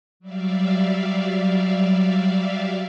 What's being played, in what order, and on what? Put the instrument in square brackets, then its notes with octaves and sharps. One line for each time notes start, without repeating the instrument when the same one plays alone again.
[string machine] F#3 G3 D5 E5 F5